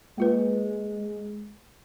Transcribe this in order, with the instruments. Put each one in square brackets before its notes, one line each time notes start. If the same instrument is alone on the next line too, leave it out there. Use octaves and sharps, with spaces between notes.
[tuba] G#3 [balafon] A#3 F4 B4